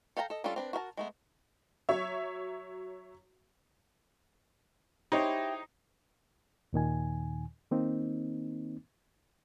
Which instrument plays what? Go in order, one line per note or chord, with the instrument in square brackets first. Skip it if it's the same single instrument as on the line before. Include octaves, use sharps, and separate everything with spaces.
[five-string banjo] A4 F5 G5 A5 A#5
A4 D#5
G3 C#4 D4 F4 A4
C4 D4 B4
F#4 A#4 E5 A5
G#3 A3 B3
[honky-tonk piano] F#3 C#5 E5
[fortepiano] D#4 C5 C#5 [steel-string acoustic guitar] E4 G4
[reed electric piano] D#2 A#2 D#3 G#5
D#3 A#3 C4 D#4